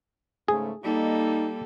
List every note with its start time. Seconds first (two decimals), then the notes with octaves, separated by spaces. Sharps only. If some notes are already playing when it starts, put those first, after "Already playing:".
0.48 G#2 C#3 A3 G#4
0.83 G3 A#3 D#4 A4